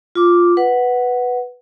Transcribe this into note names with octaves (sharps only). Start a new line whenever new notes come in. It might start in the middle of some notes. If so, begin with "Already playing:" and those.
F4 D6
B4 F#5